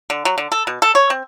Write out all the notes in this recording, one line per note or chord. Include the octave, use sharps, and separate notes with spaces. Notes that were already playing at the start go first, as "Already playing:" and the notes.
D3
F#3
D3
A4
B2
A4
C#5
C4